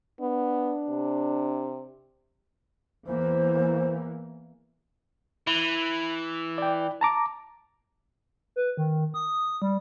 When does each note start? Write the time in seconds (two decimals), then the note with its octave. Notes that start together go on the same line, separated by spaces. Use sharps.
0.21 B3 D4
0.89 C3
3.07 E2 E3 A#3 C5
5.47 E3
6.58 D5 G5
7.01 A5 A#5 D6
8.56 B4
8.77 D#3
9.14 D#6
9.62 G3